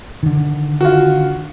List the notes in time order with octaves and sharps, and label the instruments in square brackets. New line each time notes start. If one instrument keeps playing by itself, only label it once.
[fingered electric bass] D3 D#3
[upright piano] F4 F#4